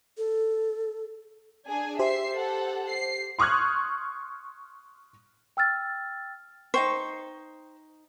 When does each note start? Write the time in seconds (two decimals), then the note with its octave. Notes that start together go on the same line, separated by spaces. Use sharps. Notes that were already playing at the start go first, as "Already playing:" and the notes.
0.18 A4
1.67 D4 G#4 G#5
1.99 G4 C5 E5 C7
2.35 A4 F#5
2.89 C7
3.39 C6 C#6 D#6 F6 F#6 G#6
5.57 G5 E6 F6 A6
6.74 D#4 C5 G5 C#6